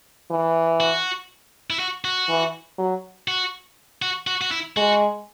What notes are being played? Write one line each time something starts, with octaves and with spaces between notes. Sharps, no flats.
E3
F#4
E4
F#4
F#4
E3
F#3
F#4
F#4
F#4
F#4
E4
G#3 F#4